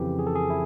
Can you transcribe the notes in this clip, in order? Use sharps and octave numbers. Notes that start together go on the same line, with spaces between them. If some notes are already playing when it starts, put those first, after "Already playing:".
Already playing: F2 C#3 E3 G4
G#4
A4
G#4
E4